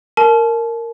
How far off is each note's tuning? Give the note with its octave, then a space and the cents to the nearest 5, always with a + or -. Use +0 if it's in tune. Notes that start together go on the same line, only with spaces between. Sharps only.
A#4 -10 A5 -35